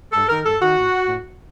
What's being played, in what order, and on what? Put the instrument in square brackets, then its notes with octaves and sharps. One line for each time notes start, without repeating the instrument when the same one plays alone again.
[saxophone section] G2 A4
D#3 A#4
G2 A4
D#3 F#4
A2
A2